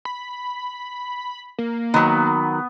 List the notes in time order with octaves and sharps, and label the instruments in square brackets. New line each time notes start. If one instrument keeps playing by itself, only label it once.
[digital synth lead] B5
A#3
[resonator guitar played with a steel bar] D#3 F#3 [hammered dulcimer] B3